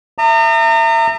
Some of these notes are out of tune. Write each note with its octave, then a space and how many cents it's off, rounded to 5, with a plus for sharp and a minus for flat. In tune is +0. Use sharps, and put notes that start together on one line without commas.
E5 +10 A#5 -35 D#6 -40